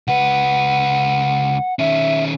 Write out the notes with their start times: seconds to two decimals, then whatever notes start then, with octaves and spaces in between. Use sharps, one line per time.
0.08 C#2 B4 F#5
1.79 D#3 C#4 E5